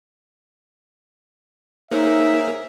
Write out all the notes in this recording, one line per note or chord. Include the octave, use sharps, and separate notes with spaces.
A#3 D#4 G#4 A#4 C5 C#5 E5 E6